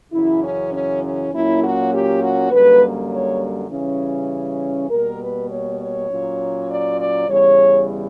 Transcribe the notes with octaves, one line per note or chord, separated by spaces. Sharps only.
F#2 C#3 E3 E4
C#4
C#4
C#4
A#2 F#3 A#3 C#4 E4
F#4
G4
F#4
F#2 D3 G3 A#3 B4
C#5
C#3 E3 G3 C#4
B2 G3 A#3 A#4
B4
C#5
C#5
A#2 F#3 C#4
D5
D5
E2 C#3 G3 C#5